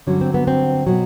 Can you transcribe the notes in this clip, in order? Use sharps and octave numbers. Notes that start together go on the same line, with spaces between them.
G2 D3 F#3 C#4
C4
B3
C4
B2 F#3